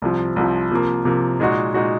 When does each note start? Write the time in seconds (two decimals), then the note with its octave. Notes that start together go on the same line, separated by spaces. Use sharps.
0.02 C2 C3 F3
0.36 C2 C3 F3
0.71 C3 F3 A#3
1.05 C3 F3 A#3
1.40 A#2 G#3 D#4 F#4
1.74 A#2 G#3 D#4 F#4